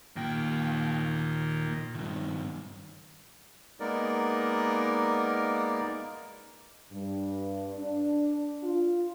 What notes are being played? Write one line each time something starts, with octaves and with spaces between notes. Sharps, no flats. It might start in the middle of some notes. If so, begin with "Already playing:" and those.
D#2 A#2 D#3 G5
G2 D#3
G#3 A#3 B3 D#4 A#4 D5
G2
D4
F4